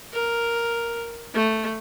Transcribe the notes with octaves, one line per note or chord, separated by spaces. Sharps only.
A#4
A3